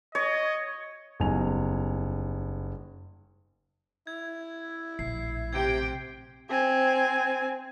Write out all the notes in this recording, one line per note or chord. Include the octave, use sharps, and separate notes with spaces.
C#5 D#5
F#1 E2 G3 D#4 G#5 F7
E4 G#6
A#1 A2 C7
C3 G5 G#6 D7
C4 G#5